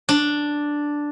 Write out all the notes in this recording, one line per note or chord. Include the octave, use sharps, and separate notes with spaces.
D4